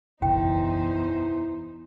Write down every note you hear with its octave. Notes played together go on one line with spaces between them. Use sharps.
F#1 B1 E2 E3 D#4 C5 G5